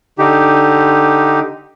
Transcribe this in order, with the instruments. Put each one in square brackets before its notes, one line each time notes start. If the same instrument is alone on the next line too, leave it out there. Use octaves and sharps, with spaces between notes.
[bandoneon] D3 D#4 G4